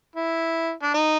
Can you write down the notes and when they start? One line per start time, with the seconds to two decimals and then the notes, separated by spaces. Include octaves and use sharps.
0.16 E4
0.83 D4
0.94 D#4